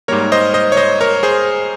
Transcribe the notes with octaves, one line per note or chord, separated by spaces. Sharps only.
G#2 G3 A#3 A#4 C#5
C5 D#5
C5 D#5
C#5
C5 D#5
A#4 C#5
G#4 C5